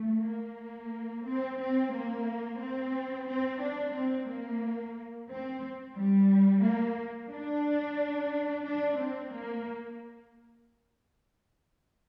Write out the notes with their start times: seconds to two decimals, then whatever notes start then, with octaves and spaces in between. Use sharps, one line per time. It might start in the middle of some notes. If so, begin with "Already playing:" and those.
Already playing: A3
0.25 A#3
1.27 C4
1.60 C4
1.93 A#3
2.61 C4
3.28 C4
3.61 D4
3.95 C4
4.29 A#3
5.30 C4
5.96 G3
6.64 A#3
7.31 D4
8.65 D4
8.99 C4
9.33 A#3